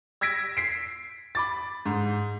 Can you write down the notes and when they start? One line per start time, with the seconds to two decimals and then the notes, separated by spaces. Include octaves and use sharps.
0.21 E6 G#6 A#6 B6 D7
0.57 B6 C7 D7
1.35 B5 D6 A6
1.86 G#2